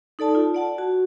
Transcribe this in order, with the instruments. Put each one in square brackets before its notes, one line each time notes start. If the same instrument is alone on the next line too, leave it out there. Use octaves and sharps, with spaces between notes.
[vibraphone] D#4 A4 D5 A5
F4
D5 F#5 A5
F#4